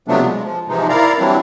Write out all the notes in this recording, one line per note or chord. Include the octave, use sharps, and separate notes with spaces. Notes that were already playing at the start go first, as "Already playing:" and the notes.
C3 F3 F#3 A3 B3 D4
G#3
F3
G#2 C3 E3 F3 G#3 D#4
E4 A#4 D5 F5 A#5
E3 F#3 G3 C4 D4 E4